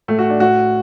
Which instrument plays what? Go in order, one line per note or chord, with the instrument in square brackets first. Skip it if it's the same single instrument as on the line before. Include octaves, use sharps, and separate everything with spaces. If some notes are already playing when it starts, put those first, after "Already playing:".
[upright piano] A2 A3
F#4
D4
A2 F#4